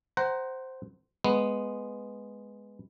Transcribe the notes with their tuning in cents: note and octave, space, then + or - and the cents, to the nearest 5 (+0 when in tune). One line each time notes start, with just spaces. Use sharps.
C5 +0 F#5 +30 A#5 +0
G#3 +0 B3 +0